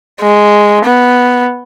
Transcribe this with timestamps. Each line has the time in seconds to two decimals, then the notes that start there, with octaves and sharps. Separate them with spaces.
0.21 G#3
0.85 B3